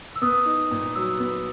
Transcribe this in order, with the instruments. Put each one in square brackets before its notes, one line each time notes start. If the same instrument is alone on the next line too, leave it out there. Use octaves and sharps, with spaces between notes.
[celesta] E6
[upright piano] B3 [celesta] D#6
[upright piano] D#4
A#2
[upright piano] F#3 [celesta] E6
[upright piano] B3